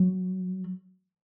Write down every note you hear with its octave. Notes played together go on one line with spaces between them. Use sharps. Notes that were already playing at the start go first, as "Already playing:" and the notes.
Already playing: F#3